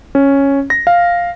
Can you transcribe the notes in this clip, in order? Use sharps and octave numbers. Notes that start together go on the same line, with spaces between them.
C#4
A#6
F5